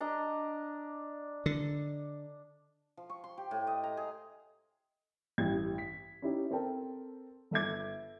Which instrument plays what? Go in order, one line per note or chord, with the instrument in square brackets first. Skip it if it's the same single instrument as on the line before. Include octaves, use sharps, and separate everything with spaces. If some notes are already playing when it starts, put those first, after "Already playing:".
[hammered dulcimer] D4 D#5 A#5
[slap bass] D3
[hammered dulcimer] F3
C#6
C6
G4
A2
D#5
A#5
G#4
[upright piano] A1 G2 G#6
B6
C#4 D#4 E4 G4
C4 A4 A#4 G5 A5
G1 A4 E5 D6 G#6